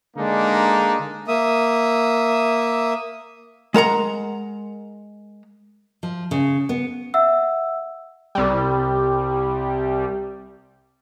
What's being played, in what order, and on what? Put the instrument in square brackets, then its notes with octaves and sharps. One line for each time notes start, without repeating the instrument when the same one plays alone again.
[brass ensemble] D3 G#3 A#3 D4 D#4
[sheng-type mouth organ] A#3 E5 D#6
[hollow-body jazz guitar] G#3 A#4 F#5 A#5
[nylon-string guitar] F3
C#3
B3
[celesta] E5 F#5 E6
[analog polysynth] C2 G3